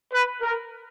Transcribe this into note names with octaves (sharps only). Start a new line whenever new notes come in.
B4
A#4